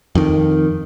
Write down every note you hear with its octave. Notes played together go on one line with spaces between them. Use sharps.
F2 D#3